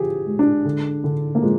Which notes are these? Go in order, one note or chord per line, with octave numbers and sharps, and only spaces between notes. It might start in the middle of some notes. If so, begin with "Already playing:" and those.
Already playing: D3 F3 G4 G#4
G#3
D4
D3
D3
A#3
F3 G#3